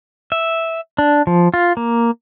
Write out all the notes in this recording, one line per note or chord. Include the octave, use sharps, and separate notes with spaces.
E5
D4
F3
F4
A#3